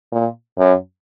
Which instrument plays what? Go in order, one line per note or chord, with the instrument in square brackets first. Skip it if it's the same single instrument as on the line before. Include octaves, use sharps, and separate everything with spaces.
[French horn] A#2
F#2